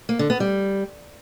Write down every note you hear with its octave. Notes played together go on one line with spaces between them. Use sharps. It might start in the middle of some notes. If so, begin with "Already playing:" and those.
A#3
D3
B3
G3